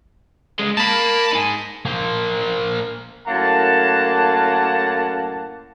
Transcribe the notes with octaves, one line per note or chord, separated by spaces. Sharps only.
C#2 G#3
A#3 A5 B5
D#4 G#4
A#3 C5
F#2 A2 A#3 F#5 A5